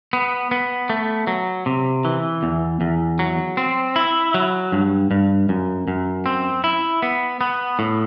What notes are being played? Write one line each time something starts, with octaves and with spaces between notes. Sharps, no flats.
B3
B3
A3
F#3
C3
E3
E2
E2
F#3
C4
E4
F#3
G2
G2
F#2
F#2
C4
E4
B3
B3
A2